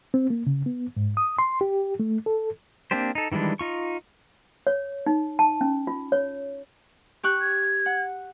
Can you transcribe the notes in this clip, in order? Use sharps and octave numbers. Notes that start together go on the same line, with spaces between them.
C4
A#3
C#3
B3
G#2
D#6
C6
G4
A3
A4
A#3 C4 D4 G4 C5
D#4 A4
D#3 E3 G3 G#3 D4
D#4 F4 C#6
C#5
D#4
A5
C#4
F4
C#5
G4 C#6 F#6
G#6
F#5